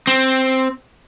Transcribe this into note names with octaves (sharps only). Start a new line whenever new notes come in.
C4